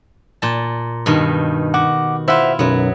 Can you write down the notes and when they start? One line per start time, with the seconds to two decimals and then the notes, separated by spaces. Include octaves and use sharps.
0.42 A#2 A5
1.06 G2 B2 D#3
1.74 F#4 F#5 D6
2.28 E4 F4 C5 E5 F#5
2.59 B1 F#2 F#3 B3